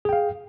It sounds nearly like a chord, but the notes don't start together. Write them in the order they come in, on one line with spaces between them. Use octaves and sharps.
G#4 G5 F5